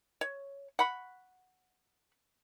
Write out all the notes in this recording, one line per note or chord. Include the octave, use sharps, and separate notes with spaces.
C#5
F#5 B5 C#6